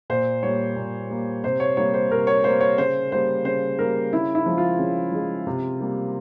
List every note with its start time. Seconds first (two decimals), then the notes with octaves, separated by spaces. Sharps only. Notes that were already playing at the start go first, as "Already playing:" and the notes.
0.10 A#2 C5
0.43 G3 A#3 C#5
0.76 A#2
1.10 G3 A#3
1.44 C3 C5
1.60 C#5
1.77 G3 A#3 C#5
1.94 C5
2.11 C3 A#4
2.27 C#5
2.44 G3 A#3 C5
2.61 C#5
2.78 C#3 C5
3.12 G3 A#3 C5
3.45 C#3 C5
3.78 G3 A#3 A#4
4.13 C#3 E4
4.35 E4
4.45 F3 G#3
4.58 F4
4.79 C#3
5.12 F3 G#3
5.47 C3
5.80 G3 A#3